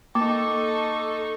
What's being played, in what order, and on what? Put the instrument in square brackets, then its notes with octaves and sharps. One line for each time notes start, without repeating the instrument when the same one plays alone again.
[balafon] A#3 [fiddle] D#4 C#6 [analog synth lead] A4 [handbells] D6